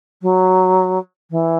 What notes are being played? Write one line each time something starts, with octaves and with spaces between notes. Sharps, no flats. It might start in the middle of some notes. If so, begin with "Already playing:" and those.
F#3
E3